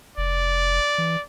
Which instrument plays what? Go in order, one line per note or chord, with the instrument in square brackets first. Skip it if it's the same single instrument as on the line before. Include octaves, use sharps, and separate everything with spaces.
[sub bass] F1 [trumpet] D5
[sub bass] E3